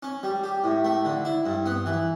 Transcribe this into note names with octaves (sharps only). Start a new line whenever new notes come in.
C#4
G3
G4
A2
A3
D3
E4
G2
B3
E3